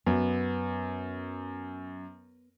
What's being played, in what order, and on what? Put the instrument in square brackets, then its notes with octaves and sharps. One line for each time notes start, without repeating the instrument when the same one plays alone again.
[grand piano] F#2 [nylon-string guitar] B3